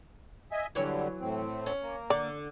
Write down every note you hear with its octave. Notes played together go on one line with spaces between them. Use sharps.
D#5 E5 G#5
D3 E3 F#3 G3 C#5
A2 C4
C#4
A#3
D3 D5